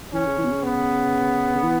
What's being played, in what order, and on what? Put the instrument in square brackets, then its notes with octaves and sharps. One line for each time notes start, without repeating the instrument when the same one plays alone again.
[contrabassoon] E3 [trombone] C#4
[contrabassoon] C#3
E3
B2
C#3
[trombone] B3
[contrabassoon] C#3
E3